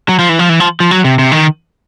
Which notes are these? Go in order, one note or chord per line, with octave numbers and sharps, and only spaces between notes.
F#3
F3
E3
F3
E3
F3
F3
F#3
C3
C3
D#3